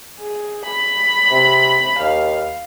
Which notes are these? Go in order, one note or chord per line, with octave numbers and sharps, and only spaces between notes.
G#4
B5
C3
D#2 F5